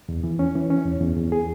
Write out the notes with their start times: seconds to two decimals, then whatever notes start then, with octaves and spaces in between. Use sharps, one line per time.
0.09 E2
0.24 E3
0.39 C#4
0.55 E3
0.70 C#4
0.85 E2
1.01 E2
1.17 E2
1.32 G#4